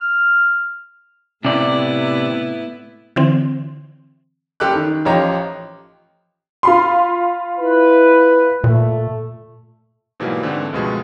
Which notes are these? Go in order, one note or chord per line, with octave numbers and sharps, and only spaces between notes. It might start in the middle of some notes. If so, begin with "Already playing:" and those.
F6
A2 C3 B3 E4 D5
D3 E3 C4
F#1 G4 A4 D6 F#6
D#3
A1 F3 G4 C#5 D#5 A#5
F4 B5 C6
E4 B4
A#2 A3
G#2 B2 E3 F#3 G3 A#3
G#2 D3 E3 A3 C4 D4
C#2 G2 B2 F3 G#3 A3